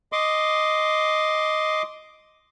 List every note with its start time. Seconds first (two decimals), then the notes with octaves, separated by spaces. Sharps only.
0.12 D#5 C6 D6